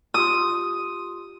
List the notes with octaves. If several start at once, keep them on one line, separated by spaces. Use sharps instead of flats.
F4 G4 C6 D#6